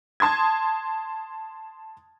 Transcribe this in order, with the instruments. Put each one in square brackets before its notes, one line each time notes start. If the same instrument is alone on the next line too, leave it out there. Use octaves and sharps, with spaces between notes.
[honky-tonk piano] A5 C6 D#6 G#6